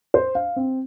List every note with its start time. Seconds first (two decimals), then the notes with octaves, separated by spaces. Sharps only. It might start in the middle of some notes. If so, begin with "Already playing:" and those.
0.14 C5
0.35 F5
0.56 C4